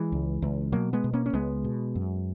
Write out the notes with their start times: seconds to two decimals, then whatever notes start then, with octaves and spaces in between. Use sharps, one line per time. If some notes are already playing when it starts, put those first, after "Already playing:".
Already playing: E3 G#3
0.12 C#2
0.42 C#2
0.72 B2 F#3 A#3
0.93 G#3 B3
1.04 B2
1.13 A#3 C#4
1.26 C#4
1.33 C#2 G#3 B3
1.64 B2
1.95 F#2